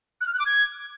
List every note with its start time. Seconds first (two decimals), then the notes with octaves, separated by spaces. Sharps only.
0.21 F#6
0.27 F6
0.33 F#6
0.39 D6
0.46 G#6